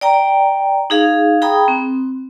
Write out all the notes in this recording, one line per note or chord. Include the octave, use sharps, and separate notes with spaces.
D5 G5 A#5
D#4 G#4 F5
G#4 G5 A#5 B5 D#6
C4